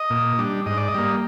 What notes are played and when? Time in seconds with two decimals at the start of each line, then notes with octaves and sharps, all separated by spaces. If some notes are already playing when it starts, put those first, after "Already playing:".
Already playing: D#5
0.10 A#2
0.38 G3 D4
0.66 G#2 D#5
0.77 D5
0.88 D#5
0.94 G3 A#3